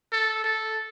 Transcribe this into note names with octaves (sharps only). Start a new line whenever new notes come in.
A4
A4